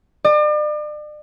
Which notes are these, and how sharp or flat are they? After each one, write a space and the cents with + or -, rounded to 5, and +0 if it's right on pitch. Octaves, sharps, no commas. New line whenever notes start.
D5 +40